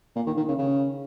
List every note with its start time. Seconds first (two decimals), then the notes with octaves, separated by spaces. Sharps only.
0.16 A#2
0.27 D#3
0.37 D#3
0.48 C#3
0.58 C#3